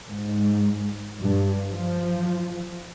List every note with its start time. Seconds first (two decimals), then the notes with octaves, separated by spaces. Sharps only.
0.10 G#2
1.20 G2
1.69 F3